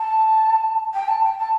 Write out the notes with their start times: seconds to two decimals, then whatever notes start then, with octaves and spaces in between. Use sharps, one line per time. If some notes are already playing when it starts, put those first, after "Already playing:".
Already playing: A5
0.93 G5
1.07 A5
1.23 G5
1.38 A5